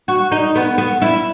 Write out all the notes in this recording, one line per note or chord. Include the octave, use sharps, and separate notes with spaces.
F#4
D#4
B3
B3
E4